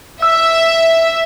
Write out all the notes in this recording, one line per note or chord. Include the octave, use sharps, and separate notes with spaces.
E5 E6